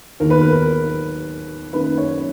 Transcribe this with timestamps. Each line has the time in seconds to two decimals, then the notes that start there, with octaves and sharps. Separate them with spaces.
0.20 D#2 D#3 A#3 A#4
0.30 B4
0.41 A#4
1.72 F#2 D#3 A#3 B4
1.98 C#5